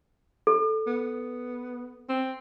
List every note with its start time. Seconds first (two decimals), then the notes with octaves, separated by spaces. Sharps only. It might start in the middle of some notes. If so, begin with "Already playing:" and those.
0.47 A4
0.87 B3
2.09 C4